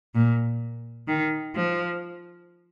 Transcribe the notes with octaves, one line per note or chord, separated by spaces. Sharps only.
A#2
D#3
F3